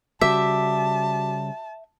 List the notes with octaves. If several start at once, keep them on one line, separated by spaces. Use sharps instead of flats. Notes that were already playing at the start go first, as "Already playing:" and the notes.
C#3 G3 F#4 E5 A5 D6 B6